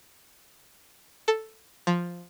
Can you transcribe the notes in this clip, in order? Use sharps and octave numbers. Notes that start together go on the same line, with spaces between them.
A4
F3